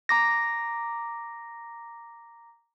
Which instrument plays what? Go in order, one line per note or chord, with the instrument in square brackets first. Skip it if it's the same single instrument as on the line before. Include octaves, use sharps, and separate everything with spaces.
[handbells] A#5 D6 A#6